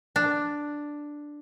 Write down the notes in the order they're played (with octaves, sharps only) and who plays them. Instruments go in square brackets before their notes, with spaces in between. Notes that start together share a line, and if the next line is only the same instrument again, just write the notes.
[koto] D4